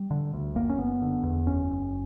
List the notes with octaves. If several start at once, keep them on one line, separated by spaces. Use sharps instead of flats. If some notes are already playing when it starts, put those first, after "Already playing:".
Already playing: G3
D3
D2
F#1 A#3
C#4
F#1 B3
D3
E2
F#1 C#4
F#1